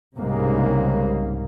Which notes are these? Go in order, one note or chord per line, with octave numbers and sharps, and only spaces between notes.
C2 G#2 C#3 A#3